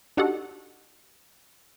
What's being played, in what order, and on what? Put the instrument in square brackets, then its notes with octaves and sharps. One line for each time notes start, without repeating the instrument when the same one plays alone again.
[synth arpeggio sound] D4 D#4 F#4 G4 A4 F#5